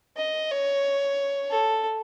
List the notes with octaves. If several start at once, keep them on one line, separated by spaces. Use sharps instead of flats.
D#5
C#5
A4